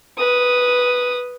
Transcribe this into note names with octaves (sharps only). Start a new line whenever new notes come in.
B4 D#6